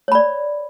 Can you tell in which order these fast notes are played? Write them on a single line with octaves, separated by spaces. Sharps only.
C#5 B5 D5